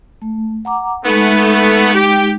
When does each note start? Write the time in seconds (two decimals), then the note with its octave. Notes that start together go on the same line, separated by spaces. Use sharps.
0.22 A3
0.65 F#5 A#5 D6
1.05 G#3 A3 B3 D#4
1.95 G4